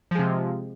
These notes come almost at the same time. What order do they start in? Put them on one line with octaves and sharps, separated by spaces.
F3 G#3 C3